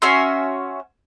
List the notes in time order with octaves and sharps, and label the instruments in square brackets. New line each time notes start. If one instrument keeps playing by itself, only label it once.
[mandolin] C#4 F#4 E5 C6